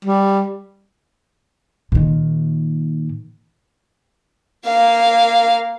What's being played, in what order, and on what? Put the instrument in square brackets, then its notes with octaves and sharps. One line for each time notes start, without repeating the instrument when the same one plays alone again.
[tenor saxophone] G3
[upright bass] A#2 D#3
[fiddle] A#3 F5